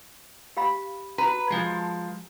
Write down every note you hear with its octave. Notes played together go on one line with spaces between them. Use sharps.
G4 F5 B5
F#4 B4 A#5
F3 G#3